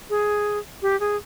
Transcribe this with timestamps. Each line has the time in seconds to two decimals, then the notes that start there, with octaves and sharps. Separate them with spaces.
0.10 G#4
0.82 G4
1.00 G#4